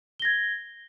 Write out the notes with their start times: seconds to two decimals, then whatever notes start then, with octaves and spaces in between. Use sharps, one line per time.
0.20 G7
0.22 A#6
0.25 G#6